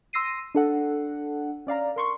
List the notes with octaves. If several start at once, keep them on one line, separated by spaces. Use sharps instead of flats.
C6 E6 A#6 C7 D#7
D4 A4 F#5
C#4 D5 F5 A#5
A#4 C6 C#6